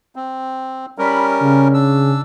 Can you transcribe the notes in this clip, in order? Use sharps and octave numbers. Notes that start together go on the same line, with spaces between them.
C4
G3 C#4 A#4 B5
C#3
D4 E6